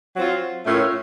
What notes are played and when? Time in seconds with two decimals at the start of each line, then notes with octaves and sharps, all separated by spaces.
0.16 F#3 C4 F4
0.65 A2 A3 C#4 F4 A#4